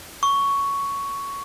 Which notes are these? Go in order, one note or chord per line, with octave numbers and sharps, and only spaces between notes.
C#6